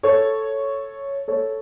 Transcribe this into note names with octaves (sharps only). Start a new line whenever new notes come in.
A4 C#5
A4 C#5